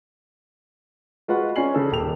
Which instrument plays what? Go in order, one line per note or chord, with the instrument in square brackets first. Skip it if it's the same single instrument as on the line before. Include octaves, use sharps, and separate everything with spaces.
[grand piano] G#3 F4 F#4 B4 F#5
C#4 F4 D5 G#5 C7 F#7
C#3 A4
D#1 G4 E6 F7